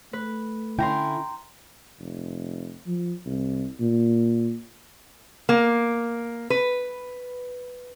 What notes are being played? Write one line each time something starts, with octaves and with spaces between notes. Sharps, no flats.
A3 B4
D3 C#4 E4 G5 A#5 C6
F1
F3
C2
A#2
A#3
B4